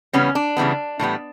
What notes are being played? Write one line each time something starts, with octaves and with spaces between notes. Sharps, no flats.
C#3 E3 G3 B3 C#4
D4
C#3 E3 G3 B3
A2 E3 G3 B3